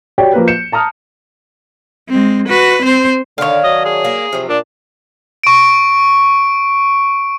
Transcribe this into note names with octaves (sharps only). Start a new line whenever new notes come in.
F#4 G4 C#5 D5 G5
F3 A#3 B4
G6 C#7 E7
A5 A#5 D#6 F6
G#3 C4
F#4 B4
C4 C5
D3 D#3 D4 C#5 F5
F#3 D#5
G#4
A#3
C3 F3 F#3
A#2 D4
C#6 D7